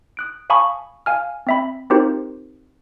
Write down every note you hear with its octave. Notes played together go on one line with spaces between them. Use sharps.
D#6 F#6 D7
F5 G#5 A5 B5 C#6 D#6
F5 G#5 F6
C4 E5 B5
C4 D#4 F4 G4 A#4 C5